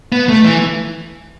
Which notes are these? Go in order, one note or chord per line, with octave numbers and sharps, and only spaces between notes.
B3
A3
E3